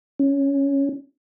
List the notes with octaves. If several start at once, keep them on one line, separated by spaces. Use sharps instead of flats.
C#4